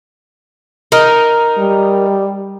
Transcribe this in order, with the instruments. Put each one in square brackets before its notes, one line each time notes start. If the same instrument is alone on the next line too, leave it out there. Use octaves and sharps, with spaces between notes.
[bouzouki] D#4 A#4
[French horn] G3